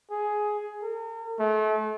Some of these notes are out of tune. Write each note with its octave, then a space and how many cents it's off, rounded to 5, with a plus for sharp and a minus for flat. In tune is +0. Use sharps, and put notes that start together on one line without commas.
G#4 +10
A#4 -40
A3 -35